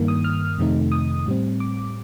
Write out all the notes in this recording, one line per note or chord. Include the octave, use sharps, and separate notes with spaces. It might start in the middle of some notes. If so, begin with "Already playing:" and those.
Already playing: G2 D#3 A#3
D#6
F6
F2 C3 D#3 A3 D#4
D#6
A2 G3 C4
D6